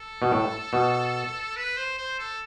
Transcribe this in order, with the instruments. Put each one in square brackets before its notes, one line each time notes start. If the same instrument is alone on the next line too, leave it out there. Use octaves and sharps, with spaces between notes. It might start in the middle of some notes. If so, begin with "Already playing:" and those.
Already playing: [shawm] A4
[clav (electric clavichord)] B2
A2
B2
[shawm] B4
C5
C5
A4